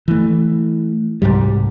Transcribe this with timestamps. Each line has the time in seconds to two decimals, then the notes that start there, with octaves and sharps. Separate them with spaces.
0.08 E3 A3
1.22 C2 F2 G#2 G3